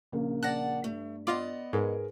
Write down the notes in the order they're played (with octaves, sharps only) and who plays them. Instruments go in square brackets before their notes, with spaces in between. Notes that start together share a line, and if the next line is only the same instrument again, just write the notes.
[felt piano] A#1 C#3 A#3
[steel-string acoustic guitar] D5 F#5 A5 [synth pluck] F#6 A#6
[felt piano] G2 [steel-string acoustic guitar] A3
[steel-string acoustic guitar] B3 D5 D#5 [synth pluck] F4 D6
[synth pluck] G#2 [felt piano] G#4 A#4 B4